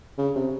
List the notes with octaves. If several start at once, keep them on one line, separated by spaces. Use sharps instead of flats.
C#3
C3